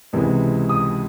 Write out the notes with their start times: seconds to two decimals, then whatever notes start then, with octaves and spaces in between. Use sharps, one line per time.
0.13 C#2 C3 E3 G#3
0.69 D#6